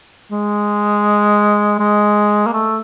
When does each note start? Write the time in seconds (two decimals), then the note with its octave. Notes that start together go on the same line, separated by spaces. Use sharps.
0.32 G#3
1.79 G#3
2.46 A#3
2.53 A3